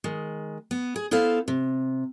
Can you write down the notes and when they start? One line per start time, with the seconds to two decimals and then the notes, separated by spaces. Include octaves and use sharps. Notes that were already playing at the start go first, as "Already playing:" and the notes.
0.04 D#3 G#3
0.71 B3
0.96 G#4
1.11 B3 E4 A4 C5 F5
1.48 C3